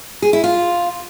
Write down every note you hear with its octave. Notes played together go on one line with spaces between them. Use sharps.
G#4
E4
F4